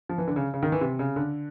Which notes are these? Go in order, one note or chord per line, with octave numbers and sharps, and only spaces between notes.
F3
E3
D3
C#3
C#3
D#3
E3
C3
C#3
D3